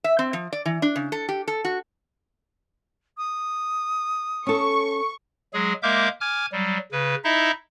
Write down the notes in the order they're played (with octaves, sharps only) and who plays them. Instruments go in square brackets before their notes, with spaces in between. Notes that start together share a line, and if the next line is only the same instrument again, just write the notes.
[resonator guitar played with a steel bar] E5
C4
F3
D5
E3
D4
C#3
A4
G4
A4
F#4
[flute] D#6
[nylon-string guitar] C#4 A4 [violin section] C#6
[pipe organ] F#3 G#3 G#4
G#3 A#3 A#4 E5 D6 G6
G#5 D6 F6 G#6
F#3 G3
C#3 B4
D#4 E4 D#5 E5